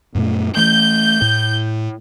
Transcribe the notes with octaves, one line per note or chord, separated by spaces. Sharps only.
F#2 A#2 A3
E3 A3 G6
A2